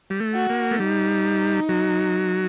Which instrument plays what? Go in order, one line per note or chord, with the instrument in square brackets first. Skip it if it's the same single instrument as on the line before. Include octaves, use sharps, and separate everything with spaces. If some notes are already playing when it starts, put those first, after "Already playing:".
[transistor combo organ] G3
A3
[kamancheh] F#4
[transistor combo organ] A#3
A3
[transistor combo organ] G3 [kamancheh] D#4
[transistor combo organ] F#3